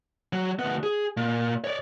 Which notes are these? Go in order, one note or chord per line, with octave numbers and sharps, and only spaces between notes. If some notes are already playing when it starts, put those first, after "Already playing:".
F#3
D2 B3
G#4
A#2
C#5 D5